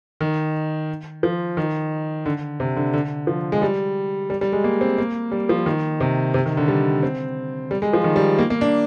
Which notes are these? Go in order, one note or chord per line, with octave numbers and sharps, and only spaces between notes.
D#3
F3
D#3
D3
C3
D3
D3
F3
G#3
G3
G3
G3
G#3
A#3
C4
A#3
G3
F3
D#3
C3
C3
D#3
D3
G3
C4
G3
G#3
F3
D#3
G3
A#3
A#3
D4